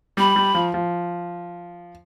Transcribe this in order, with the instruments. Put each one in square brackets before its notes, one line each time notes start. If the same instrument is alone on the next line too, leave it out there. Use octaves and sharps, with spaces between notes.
[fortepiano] G3 [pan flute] B5
[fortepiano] G3
F3
F3